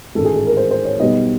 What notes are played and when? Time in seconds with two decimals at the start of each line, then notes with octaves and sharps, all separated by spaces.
0.15 A1 G#2 D#3 G#3 A4
0.25 G#4
0.36 G#4
0.47 A#4
0.57 C5
0.71 C5
0.85 C#5
1.00 B1 B2 G3 B3 D#5